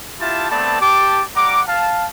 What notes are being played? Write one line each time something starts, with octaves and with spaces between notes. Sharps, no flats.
E4 F4 G4 E5 A5
A3 B3 C4 B4 D5 A5
G4 A5 D6
G3 F#5 A#5 D6
F5 A5